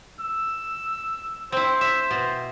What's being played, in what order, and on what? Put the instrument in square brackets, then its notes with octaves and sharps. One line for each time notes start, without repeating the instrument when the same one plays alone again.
[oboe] E6
[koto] C4 E4 [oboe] C5
[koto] E5
B2